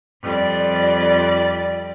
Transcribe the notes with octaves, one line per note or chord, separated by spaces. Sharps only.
F2 G3 D5